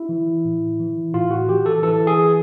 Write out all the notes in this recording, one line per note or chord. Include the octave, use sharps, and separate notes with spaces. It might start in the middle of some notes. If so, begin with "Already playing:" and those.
Already playing: E4
E3
A2
E3
A2 F4
F#4
E3 G4
A4
E3 A4
G#4